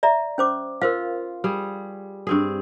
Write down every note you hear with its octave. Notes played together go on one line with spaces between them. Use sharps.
D5 E5 A#5
C#4 C5 D6
F4 A#4 C5 F5
G3 G#4
G2 C4 G#4